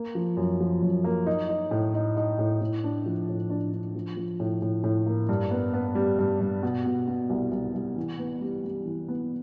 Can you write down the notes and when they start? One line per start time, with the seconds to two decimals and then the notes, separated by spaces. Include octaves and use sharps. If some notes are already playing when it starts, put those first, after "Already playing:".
Already playing: A#3
0.15 F3
0.37 F#2
0.61 F3
0.82 F#2
1.04 A#3
1.26 D#4
1.49 D#4
1.71 A2
1.94 D#4
2.17 D#4
2.39 A2
2.61 A2
2.84 D4
3.06 F3
3.28 A2
3.50 D4
3.73 D4
3.95 F3
4.17 F3
4.40 A2
4.62 A2
4.84 A2
5.06 A#3
5.29 G2
5.51 B3
5.74 B3
5.95 G3
6.19 G2
6.41 G2
6.63 B2
6.85 B2
7.08 B2
7.30 C2
7.52 C2
7.74 C2
7.96 E3
8.19 B3
8.41 G3
8.64 G3
8.86 E3
9.08 B3